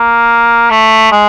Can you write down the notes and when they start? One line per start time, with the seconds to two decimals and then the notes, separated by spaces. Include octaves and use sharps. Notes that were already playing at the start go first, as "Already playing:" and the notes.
Already playing: A#3
0.70 A3
1.12 G#3